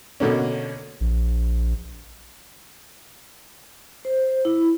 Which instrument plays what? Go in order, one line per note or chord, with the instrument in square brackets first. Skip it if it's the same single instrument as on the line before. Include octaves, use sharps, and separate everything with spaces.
[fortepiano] B2 D3 A#3 C#4
[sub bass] A#1
[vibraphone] C5
E4